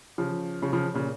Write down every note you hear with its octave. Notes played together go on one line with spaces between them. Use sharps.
C#3 F3
C#3 F3
C#3 F3
A#2 C#3